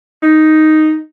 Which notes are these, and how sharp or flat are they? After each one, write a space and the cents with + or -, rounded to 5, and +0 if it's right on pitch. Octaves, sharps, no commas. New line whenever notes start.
D#4 +0